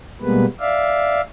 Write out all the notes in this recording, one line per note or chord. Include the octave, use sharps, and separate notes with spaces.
B2 G3 G#3 A#3 B3 B4
D5 E5 F5